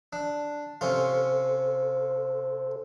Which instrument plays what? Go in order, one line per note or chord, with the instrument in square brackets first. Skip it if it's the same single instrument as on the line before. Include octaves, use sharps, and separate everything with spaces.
[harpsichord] D4
[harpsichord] C3 C#4 F4 [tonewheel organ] A4 C5